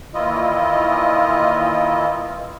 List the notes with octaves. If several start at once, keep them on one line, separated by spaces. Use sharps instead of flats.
A#2 D#3 E3 E4 F4 D#5